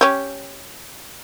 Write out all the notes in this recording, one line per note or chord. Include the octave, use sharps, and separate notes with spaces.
C#4 G4